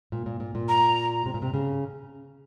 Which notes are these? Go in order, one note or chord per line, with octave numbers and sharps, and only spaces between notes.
A#2
A#2
A#2
A#2
A#5
C3
A#2
C3
C#3